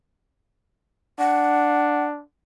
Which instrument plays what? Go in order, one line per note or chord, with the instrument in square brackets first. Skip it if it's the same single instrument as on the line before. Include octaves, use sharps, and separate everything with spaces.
[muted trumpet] D4 [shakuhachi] F#5